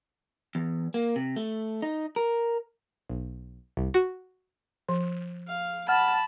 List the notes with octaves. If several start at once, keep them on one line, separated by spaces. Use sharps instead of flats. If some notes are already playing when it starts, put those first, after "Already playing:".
E2
A#3
C3
A3
D#4
A#4
B1
C2
F#4
F3
F5
F#5 A5 B5 F6